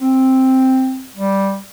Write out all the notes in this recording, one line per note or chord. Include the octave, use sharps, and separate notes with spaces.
C4
G3